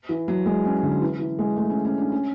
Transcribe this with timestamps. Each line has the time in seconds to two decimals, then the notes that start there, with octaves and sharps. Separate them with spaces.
0.09 E3
0.28 F#3
0.46 G#3
0.65 C#4
0.83 D3
1.02 E3
1.19 E3
1.39 G#3
1.56 A3
1.70 C#4
1.85 C#4
1.97 D4
2.12 C#4